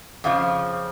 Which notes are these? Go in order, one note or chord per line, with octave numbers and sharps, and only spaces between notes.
F2 C#3 F3 F5